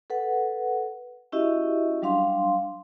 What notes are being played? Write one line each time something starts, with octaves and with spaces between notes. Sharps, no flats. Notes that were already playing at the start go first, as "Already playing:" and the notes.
A4 B4 F#5
C#4 E4 F#4 G4 D#5 E5
F#3 G3 D4 F5 C6